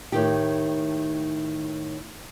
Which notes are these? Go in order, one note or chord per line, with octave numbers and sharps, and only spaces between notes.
A2 D#3 G4